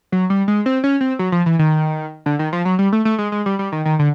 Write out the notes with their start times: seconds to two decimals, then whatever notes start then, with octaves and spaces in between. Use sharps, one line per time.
0.12 F#3
0.30 G3
0.48 G#3
0.66 C4
0.84 C#4
1.01 C4
1.19 F#3
1.32 F3
1.46 E3
1.59 D#3
2.26 D3
2.39 D#3
2.53 F3
2.65 F#3
2.79 G3
2.93 A3
3.05 A3
3.19 G#3
3.32 G#3
3.46 G3
3.59 G3
3.72 D#3
3.85 D#3
3.99 D3